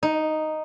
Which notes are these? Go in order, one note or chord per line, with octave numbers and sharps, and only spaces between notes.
D#4